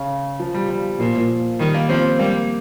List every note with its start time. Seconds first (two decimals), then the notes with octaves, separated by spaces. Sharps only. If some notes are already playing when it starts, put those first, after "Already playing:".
Already playing: C#3
0.40 F3
0.54 G3
0.69 G3
0.99 A#2 F3
1.59 D#3 G3
1.74 A#3
1.89 F3 C4
2.19 G3 A#3